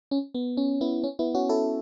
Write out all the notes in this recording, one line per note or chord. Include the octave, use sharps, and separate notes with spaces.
C#4
B3
C#4
B3 E4
C#4
B3 E4
C#4 F#4
E4 A4